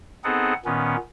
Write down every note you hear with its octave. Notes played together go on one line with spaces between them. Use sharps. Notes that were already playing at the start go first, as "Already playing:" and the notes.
B3 C4 D#4 G#4 A4 F#5
A#2 D#3 B3 C#4